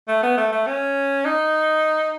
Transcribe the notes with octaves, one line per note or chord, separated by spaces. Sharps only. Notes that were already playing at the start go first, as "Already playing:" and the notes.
A3
B3
A3
A3
C#4
D#4